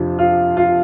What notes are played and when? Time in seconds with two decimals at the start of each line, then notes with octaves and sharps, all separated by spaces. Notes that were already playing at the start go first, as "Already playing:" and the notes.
Already playing: F2 C3 F3 D4
0.19 F4
0.57 F4